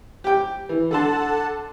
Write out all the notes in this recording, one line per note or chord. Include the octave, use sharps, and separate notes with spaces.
G4 G5
E3
D3 A4 F#5 A5 C6